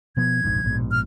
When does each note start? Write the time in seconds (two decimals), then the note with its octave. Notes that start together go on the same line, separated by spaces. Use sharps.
0.17 B2 F3 B3 G#6
0.44 F1 A#1 G#2
0.64 A#1 G#2 B2
0.91 F6